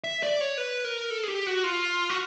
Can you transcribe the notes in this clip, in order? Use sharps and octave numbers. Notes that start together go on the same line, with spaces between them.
E5
D5
C#5
B4
A#4
A4
G#4
G4
F#4
F4
F#4